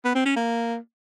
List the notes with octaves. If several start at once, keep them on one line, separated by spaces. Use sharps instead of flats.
B3
C4
C#4
A#3